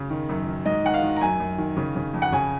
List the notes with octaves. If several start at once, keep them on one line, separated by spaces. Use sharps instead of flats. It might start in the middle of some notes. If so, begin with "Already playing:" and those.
Already playing: C#3
D#3
F#2
D#3
G#2 D#5
D#3 F#5
F5
D#3
A#5
F#2 G#5
F#2
D#3
C#3
C#3
F2
F#5
C#3 G#5